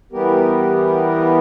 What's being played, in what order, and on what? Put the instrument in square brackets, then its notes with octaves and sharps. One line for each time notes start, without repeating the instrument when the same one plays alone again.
[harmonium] E3 G3 B3 G4 A#4